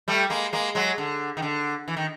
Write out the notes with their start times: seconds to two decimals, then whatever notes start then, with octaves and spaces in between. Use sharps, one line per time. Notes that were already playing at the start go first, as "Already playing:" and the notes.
0.08 G3 A3
0.30 G#3 A#3
0.53 G#3 A#3
0.75 F#3 G#3
0.98 D3
1.37 D#3
1.42 D3
1.88 E3
1.97 D#3